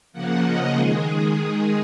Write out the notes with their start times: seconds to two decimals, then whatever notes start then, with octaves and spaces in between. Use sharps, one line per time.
0.13 C#3 F3 A#3 F#5
0.44 D#5
0.74 D#3 G#3 G#4